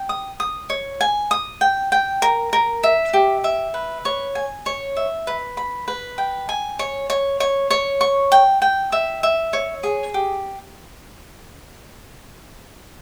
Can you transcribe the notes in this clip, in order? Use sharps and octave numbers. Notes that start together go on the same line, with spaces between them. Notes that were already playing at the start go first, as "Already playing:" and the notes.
Already playing: G5
D#6
D#6
C#5
G#5
D#6
G5
G5
A#4
A#4
E5
G4
E5
B4
C#5
G#5
C#5
E5
B4
B5
B4
G5
G#5
C#5
C#5
C#5
C#5
C#6
G5
G5
E5
E5
C#5
G#4
G4